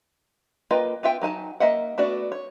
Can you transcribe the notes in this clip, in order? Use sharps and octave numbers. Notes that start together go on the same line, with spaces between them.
A#3 F4 B4 D#5 G5
B3 F4 E5 G5
F#3 D#4 G#5 A5
A#3 D#5 E5 F#5
A3 B3 D4 F#4 D5
C#5